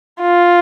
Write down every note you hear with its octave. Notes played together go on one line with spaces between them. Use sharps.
F4